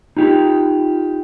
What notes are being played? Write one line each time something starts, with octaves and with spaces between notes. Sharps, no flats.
D#4 F4 G4